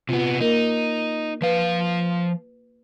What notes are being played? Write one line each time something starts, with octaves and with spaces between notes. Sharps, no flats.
C3 B3 F4
A#3 D#4 A#4
F3 B4 F5